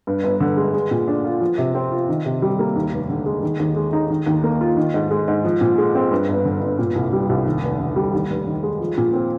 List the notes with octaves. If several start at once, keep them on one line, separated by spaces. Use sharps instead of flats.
G2
G1
D3
G#3
G#3
A#2
D4
F4
F3
C3
C4
F4
D#3
C3
G3
A#3
D#2
F1
D3
G#3
D#3
D#2
G#3
D#4
D#3
D#2
A#3
F4
D#3
G#2
G#3
G#2
F3
A#2
G#3
C4
G2
G1
D3
G1
A#2
C2
G3
C2
D#2
F1
D3
G3
D#2
F1
D#3
G#3
F3
A#2
C4